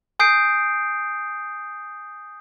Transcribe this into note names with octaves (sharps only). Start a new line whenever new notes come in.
G#5 D#6 G6 C7 D7